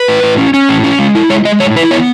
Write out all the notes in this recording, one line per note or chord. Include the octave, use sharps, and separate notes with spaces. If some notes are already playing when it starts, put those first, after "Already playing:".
Already playing: B4
A2
A2
C#4
C#4
A2
C#4
G#3
E4
G#3 C#5
G#3 D#5
A2 C#5
E4 B4
B3 C#5